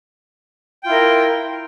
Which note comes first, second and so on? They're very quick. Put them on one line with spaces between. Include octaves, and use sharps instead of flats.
G5 F4 E4 A#4